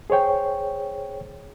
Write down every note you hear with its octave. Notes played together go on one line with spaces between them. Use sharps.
G#4 C5 C#5 G5